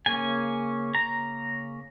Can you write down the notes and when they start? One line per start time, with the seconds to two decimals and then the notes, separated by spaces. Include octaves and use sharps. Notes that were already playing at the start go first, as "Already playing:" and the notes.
0.06 C#3 A#3 C#4 G#5
0.95 A#5